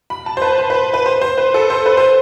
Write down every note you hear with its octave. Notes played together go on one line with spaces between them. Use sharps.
B5
A5
C5
B4
C5
B4
B4
C5
C5
B4
A4
C5
B4
C5